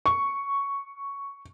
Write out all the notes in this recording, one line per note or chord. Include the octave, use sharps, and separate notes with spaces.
C#6